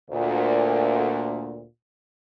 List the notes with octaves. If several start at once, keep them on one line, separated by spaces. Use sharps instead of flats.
D2 A#2